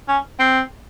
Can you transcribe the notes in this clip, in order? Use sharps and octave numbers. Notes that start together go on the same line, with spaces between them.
C#4
C4